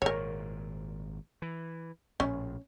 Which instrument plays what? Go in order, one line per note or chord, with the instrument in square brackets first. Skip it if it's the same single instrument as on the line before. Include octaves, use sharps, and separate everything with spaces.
[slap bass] G#1 A#2 [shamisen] A#4 C#5
[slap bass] E3
[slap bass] A#1 A2 [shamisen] C#4